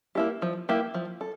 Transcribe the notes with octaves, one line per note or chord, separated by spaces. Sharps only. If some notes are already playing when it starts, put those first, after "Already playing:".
A#3 E4 G4
F3
A#3 E4 G4
F3
A4